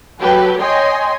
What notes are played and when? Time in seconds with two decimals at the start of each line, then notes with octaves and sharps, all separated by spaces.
0.19 F#3 G4 A4 B4
0.61 C#5 D#5 G5 G#5 C6